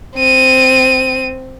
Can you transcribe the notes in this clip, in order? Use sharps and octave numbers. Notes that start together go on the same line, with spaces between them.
C4 D#7